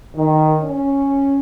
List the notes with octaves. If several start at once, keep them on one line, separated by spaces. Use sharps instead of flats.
D#3
C#4